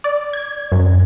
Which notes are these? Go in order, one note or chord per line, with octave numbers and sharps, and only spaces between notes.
D5
G#6
F#2